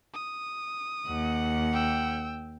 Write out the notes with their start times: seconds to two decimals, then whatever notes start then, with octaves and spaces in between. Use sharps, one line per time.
0.14 D#6
1.07 D#2 F#5
1.73 G5 E6